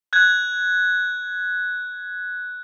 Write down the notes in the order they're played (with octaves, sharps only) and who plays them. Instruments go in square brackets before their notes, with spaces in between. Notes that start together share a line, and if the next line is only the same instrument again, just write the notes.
[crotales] F#6 G#6